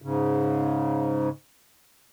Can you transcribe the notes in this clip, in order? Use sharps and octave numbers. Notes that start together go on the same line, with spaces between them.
G#2 C#3